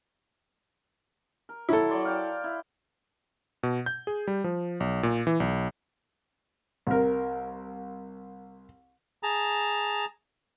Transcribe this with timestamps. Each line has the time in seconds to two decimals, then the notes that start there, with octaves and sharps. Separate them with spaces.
1.49 A#4
1.69 F#3 E4 A4
1.89 F#3 D5 C6
2.05 F5 G5 D6
2.44 E4
3.63 B2
3.86 G6
4.07 G#4
4.27 G3
4.44 F3
4.80 B1
5.03 A#2
5.27 E3
5.40 B1
6.87 C2 A#4
9.23 G#4 A5 A#5